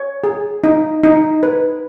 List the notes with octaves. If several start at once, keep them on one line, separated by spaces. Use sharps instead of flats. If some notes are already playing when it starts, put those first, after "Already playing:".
Already playing: C#5
G#4
D#4
D#4
B4